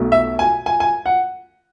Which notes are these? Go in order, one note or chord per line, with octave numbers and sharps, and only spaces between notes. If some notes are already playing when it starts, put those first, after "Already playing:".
Already playing: B1 B2 A3
E5
G#5
G#5
G#5
F#5